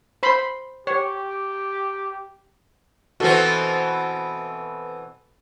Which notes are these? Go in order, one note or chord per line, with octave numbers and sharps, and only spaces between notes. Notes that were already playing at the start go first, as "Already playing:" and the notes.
C5 B5 C6
G4 C#5
B2 E3 C4 F#4 A4